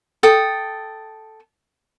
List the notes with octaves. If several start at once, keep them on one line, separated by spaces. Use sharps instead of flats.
A4 G5 D#6